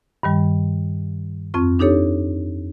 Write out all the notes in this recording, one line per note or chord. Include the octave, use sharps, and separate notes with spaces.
G2 D#3 G3
F2 C4 F4 C#6
D4 D#4 G4 A4 C#5